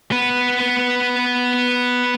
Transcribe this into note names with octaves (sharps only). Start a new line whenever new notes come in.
B3 B4